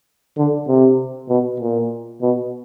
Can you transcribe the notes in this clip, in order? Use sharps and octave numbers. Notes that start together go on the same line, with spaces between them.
D3
C3
B2
A#2
B2